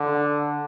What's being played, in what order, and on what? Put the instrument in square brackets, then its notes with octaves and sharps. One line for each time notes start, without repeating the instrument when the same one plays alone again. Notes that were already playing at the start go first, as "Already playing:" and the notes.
Already playing: [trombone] D3